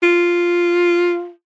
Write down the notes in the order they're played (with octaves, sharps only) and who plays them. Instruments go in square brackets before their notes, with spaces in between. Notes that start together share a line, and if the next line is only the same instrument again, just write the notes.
[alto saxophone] F4